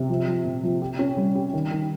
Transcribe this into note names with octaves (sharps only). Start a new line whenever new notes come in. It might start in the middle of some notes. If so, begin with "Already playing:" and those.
Already playing: C3
F3
F3
A#2
F3
G4
C#4
G3
G4
D#3
D#3